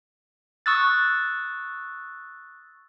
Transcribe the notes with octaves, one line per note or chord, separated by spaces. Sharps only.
C#6 D#6 E6 F#6 A6